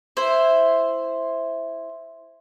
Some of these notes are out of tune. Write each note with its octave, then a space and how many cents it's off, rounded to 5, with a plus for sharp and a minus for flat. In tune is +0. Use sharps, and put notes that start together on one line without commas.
E4 +0 C5 +0